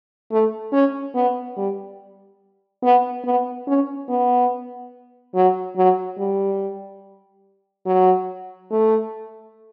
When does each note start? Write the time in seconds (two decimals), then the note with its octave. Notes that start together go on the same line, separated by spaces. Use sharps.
0.31 A3
0.72 C#4
1.14 B3
1.56 G3
2.83 B3
3.24 B3
3.67 C#4
4.09 B3
5.34 F#3
5.76 F#3
6.18 G3
7.86 F#3
8.71 A3